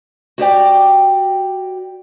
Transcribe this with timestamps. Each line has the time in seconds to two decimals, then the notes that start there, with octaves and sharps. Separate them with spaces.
0.38 F#4 G4 D5 G5